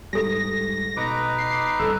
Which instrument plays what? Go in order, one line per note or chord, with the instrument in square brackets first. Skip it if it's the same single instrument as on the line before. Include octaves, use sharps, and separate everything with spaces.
[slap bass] G#2 G3 [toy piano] G4 A4 [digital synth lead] A#6
[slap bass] B2 [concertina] D#4 B4 D6
[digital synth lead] C7
[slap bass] G1 C2 [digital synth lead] A4